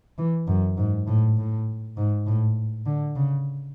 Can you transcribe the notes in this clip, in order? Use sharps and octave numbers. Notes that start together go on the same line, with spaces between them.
E3
F#2
G#2
A2
A2
G#2
A2
D3
C#3